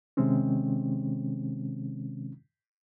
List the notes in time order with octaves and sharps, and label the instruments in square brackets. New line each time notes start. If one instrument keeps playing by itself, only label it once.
[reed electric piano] C3 D#3 G#3 C4 C#4